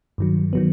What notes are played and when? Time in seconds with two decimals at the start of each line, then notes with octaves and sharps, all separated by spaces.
0.18 G2 D#3 F#3
0.53 D#3 F#3 B3